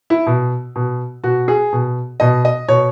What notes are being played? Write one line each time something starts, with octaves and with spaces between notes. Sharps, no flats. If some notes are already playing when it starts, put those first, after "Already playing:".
E4
B2
B2
B2 F#4
G#4
B2
B2 D#5
D#5
B2 C#5